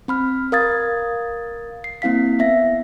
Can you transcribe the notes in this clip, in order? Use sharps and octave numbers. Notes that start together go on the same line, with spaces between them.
C4 B5 F6
A#4 F5 D#6 G#6 A6
C7
A#3 C4 E4 F5 B6
B3 E5 A#6